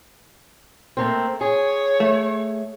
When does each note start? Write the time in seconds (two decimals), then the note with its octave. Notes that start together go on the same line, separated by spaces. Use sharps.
0.97 A3 A#3 C4
1.41 G#4 C#5
2.00 A3